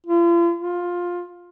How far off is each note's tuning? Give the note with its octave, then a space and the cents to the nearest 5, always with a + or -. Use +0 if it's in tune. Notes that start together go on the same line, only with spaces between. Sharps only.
F4 -40
F4 +15